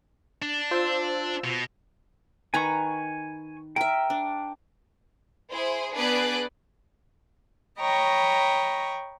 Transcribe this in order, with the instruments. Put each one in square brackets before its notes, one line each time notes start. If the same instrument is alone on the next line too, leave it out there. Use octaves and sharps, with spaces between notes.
[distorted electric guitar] D4
[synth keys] F4 C5 E6
[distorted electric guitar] B2
[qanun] D#3 B4 A#5 [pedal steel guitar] G#5 C#6
[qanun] A#4 E5 [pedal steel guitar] G5
[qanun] D4
[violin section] E4 G#4 C5
B3 D4 G#4 B4 D5 F#6
[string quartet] C#5 D#5 G5 A#5 B5 C#6